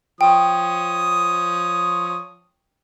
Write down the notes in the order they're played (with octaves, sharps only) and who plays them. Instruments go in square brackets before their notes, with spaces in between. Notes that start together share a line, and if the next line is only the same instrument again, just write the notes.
[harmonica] F3 C#5 D#6 [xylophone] G5